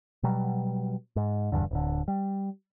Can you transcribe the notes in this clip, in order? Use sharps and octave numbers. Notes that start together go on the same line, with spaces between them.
B2 F#3 G3
G#2
D#1 E2 G2 D3
D1 D3
G3